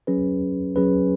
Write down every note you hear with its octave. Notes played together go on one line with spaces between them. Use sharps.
F#3 C#4 G#4 B4
F#3 C#4 G#4 B4